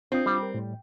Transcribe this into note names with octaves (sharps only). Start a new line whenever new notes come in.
C4 D4 F4 D#6
G3
A#4
A2